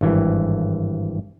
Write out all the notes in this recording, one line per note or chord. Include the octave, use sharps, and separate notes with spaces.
G#1 G2 E3